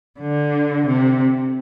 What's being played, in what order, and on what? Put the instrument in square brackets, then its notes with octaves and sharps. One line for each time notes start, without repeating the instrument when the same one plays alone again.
[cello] D3
C3